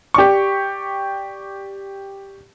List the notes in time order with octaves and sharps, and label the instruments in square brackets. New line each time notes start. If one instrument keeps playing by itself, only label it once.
[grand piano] G4 D5 C#6